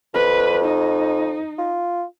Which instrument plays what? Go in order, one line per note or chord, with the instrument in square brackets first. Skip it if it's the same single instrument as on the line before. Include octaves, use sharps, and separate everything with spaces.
[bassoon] F2 [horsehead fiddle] B4
[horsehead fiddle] D#4
[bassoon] F4